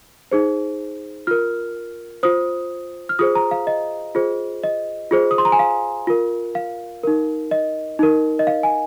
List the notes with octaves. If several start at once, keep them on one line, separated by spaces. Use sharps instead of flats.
D#4 G#4 C5
F4 A#4 F6
F4 C5 D#6
F6
F4 G#4 C5 D#6
A#5
F5
D#5
F4 G#4 C5
D#5
F4 G#4 C5
D#6
C6
A#5
G#5
F5
F4 A#4
F5
D#4 A#4
D#5
D#4 A#4
D#5
F5
G#5